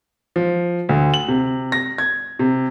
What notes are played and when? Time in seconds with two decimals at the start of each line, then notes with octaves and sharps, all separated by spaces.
0.36 F3
0.89 D2
1.14 F#7
1.28 C3
1.72 A#6
1.98 G#6
2.39 C3